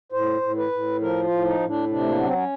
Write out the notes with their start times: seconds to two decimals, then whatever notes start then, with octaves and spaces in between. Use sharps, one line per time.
0.12 A2 C5
0.41 A2
0.57 B4
0.72 A2
1.01 F3 A#4
1.23 F4
1.30 A2
1.45 D#4
1.60 A2
1.67 D4
1.89 C3 D4
2.00 A3
2.08 A#3
2.17 F#3 B3
2.25 C4
2.33 C#4